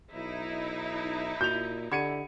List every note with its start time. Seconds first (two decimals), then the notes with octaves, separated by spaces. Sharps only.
0.13 B1 D#4 E4
1.41 A#2 F#4 G6 F7
1.92 D3 G4 F#5 B5 G#6 C#7 D#7